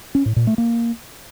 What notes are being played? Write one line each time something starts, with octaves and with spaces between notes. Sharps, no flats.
C#4
A2
A#2
A3
A#3